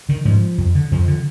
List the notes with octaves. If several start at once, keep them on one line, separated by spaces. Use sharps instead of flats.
D3 D#3
G#2 F3
F2
D3
F2 F3
D3